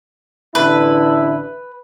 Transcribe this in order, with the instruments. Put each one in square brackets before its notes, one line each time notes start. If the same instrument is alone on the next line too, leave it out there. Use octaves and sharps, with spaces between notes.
[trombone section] A1 D3 E4 [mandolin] B4